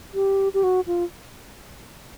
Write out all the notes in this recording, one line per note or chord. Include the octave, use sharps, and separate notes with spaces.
G4
G4
F#4
F4